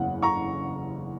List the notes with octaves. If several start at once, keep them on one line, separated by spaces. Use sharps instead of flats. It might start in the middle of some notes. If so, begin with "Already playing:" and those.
Already playing: F#1 E2 C#3 F#5
A#5 C#6